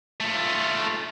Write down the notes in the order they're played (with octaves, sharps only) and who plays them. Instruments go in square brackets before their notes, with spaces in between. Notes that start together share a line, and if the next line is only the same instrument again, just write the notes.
[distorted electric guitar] A3 F4